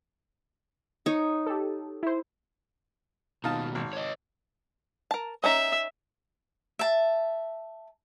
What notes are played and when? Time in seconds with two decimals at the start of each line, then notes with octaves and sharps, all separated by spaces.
1.06 D#4 C#5
1.46 G4 A4
2.03 E4 C5
3.44 D#2 B2 D#4 F4 A5
3.75 G#1
3.93 C#5 D#5
5.11 A#4 A5
5.44 C#4 D#4 E5 A#5
6.79 E5 A5